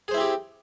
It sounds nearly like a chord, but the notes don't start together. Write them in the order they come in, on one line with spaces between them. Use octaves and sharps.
G#4 C5 E4 C4 G4